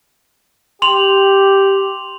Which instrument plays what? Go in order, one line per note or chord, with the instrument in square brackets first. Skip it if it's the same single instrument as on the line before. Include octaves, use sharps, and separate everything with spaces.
[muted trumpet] G4 [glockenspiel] C6 F7 F#7